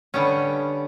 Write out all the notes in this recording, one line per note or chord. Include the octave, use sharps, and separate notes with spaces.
D3 G3 B3 C#4